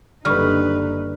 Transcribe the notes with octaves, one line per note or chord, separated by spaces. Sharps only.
F#1 D3 G3 D#4 B4 C#6 F6